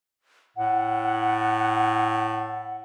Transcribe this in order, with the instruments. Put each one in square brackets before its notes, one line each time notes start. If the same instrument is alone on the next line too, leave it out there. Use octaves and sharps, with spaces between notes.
[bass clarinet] A2 [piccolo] F#5